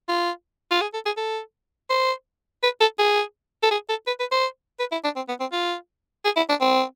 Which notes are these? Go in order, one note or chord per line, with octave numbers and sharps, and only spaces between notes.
F4
F4
G#4
A4
G#4
A4
C5
B4
A4
G#4
A4
G#4
A4
B4
B4
C5
B4
E4
D4
C4
B3
C4
F4
G#4
E4
D4
C4